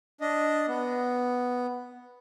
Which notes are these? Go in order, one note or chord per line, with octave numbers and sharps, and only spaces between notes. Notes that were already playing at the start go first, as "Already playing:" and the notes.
D4 D#5
B3